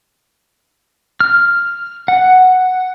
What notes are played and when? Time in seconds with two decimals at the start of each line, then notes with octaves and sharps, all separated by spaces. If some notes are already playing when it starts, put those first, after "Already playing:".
1.20 F6
2.08 F#5